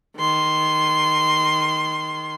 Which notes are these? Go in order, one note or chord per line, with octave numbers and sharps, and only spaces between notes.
D#3 C6